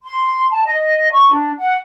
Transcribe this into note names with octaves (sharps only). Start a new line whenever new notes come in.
C6
A5
D#5
C#6
D4
F#5